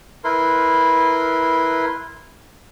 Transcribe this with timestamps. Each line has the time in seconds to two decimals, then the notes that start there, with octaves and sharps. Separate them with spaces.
0.24 E4 A#4 B4 C6